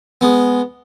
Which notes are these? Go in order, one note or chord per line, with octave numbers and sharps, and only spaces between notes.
G#3 B3